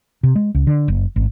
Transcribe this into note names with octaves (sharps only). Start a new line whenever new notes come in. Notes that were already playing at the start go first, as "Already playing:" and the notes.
C3
G#3
C#2
D3
F#1
G#1